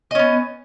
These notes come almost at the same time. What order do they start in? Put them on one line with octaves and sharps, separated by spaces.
D#5 C#4 B3